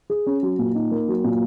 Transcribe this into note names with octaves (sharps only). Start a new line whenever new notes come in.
G#4
C#4
F#3
A#2
D#4
A#3
F#3
A#2